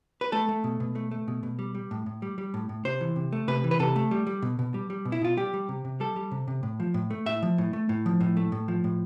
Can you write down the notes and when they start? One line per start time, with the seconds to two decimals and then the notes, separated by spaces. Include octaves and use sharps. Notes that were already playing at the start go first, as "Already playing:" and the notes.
0.21 B4
0.32 A3 A4
0.49 A3
0.64 B2
0.80 B2
0.95 A3
1.11 A3
1.28 B2
1.43 B2
1.59 G3
1.75 G3
1.91 A2
2.06 A2
2.22 G3
2.38 G3
2.54 A2
2.69 A2
2.85 C3 C5
3.01 E3
3.16 C3
3.32 A3
3.48 C3 B4
3.64 E3
3.71 B4
3.79 C3 A4
3.96 A3
4.11 G3
4.27 G3
4.42 B2
4.59 B2
4.74 G3
4.90 G3
5.05 B2
5.12 E4
5.21 B2 F4
5.37 G3 G4
5.54 G3
5.69 C3
5.85 C3
6.00 G3 A4
6.16 G3
6.31 C3
6.48 C3
6.63 A2
6.80 F3
6.94 A2
7.11 A3
7.26 A2 E5
7.43 F3
7.58 A2
7.73 A3
7.89 A2
8.06 F3
8.20 A2
8.37 A3
8.52 A2
8.68 F3
8.84 A2